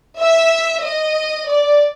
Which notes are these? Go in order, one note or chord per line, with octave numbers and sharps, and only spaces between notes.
E5
D#5
D5